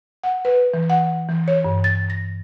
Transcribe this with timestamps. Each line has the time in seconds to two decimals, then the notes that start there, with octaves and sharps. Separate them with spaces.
0.24 F#5
0.45 B4
0.74 E3
0.90 F#5
1.29 E3
1.48 C#5
1.64 G2
1.84 A6
2.10 A#6